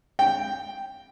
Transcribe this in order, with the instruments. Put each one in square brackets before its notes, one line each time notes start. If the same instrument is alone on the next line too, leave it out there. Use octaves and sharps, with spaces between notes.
[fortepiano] G5